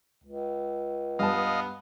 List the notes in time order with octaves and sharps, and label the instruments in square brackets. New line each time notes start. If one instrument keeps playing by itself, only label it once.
[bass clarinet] C#2
[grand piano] G2 A5 [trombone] B3 [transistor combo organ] D#5 F5